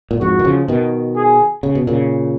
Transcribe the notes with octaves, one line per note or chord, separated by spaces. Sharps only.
A#2
F2 G#2 F#4
D#3
C#3 F3
B2 D#3
G#4
C#3
B2
A#2 C#3